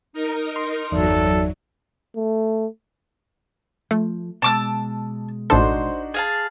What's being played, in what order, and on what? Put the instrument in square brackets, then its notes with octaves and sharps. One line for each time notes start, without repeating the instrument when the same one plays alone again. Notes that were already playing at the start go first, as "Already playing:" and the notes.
[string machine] D#4 A#4
[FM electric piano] C6
[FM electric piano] G1 E2 [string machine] F#3 [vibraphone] D#4 D5 E5 [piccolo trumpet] A4
[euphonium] A3
[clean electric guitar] F3 [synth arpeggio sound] A3
[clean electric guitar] B2 G#3 [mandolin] A5 D6 E6
[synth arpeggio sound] A1 A4 [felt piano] D4 D#4 F#4 [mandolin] C5
[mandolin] G#4 F5 A5